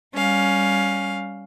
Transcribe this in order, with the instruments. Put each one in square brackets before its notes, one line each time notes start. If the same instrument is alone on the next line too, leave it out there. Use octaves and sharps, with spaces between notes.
[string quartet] G3 C#4 F5